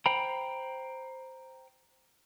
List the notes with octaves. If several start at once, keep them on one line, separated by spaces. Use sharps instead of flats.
C5 G5 A#5 B5